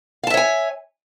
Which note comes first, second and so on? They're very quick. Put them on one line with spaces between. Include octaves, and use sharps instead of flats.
F5 A5 E5 C#5 G#5